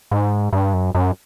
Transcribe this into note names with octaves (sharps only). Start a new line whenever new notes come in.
G#2
G2
F#2
F#2